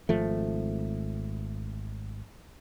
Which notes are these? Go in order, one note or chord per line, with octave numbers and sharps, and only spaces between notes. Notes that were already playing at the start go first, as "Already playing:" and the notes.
G#1 F3 A3